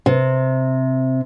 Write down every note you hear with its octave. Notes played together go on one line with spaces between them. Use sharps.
C3